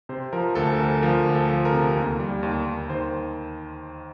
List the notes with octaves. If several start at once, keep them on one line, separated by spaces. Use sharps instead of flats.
C3 C5
F3 A#4
D2 A4
D2 A#4
F3 A#4
D2
A4
F3
A#4
C3
D#2
G3
D#2
D#2
D#3 C5